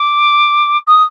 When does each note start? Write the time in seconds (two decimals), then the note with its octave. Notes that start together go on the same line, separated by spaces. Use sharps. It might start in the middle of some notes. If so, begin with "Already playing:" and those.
Already playing: D6
0.87 D#6